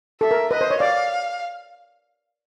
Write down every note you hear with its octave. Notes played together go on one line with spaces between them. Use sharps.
A4 E5
A#4
B4 D#5
C5
C#5
D5 F5